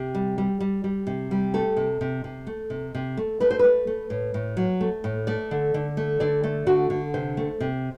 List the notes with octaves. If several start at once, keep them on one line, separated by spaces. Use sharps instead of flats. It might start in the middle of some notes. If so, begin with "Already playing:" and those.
Already playing: C3 G4
G3
G3
G3
G3
C3
G3
A3 A4
C3
C3
C3
A3
C3
C3
A3
A3 B4
C5
A3 B4
A3
A2
A2
F#3
A3
A2
A3 D5
D3
D3
A3
D3 D5
A3
D3 F#4
D3
C3 C5
A3
C3